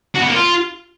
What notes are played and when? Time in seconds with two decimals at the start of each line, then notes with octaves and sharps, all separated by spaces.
0.15 F#4
0.21 B3
0.28 A#3
0.34 F4